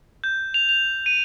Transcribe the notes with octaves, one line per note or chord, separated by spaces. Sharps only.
G6
F7
F7
D#7